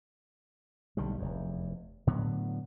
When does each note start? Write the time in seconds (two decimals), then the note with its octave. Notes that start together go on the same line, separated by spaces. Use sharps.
0.97 B1 D3 D#3 G3
1.18 F1 E2
2.07 A2 D3 F#3 B3